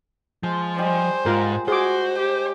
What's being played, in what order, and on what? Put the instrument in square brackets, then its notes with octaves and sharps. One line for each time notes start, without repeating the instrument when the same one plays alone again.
[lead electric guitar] F3 [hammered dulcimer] G#3
[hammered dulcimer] G3 D#5 G#5 [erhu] C5
[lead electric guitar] G#2 [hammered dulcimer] G#3 [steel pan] F4 A#4
[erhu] F#4 [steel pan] G#4 D6 [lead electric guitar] C5
[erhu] G4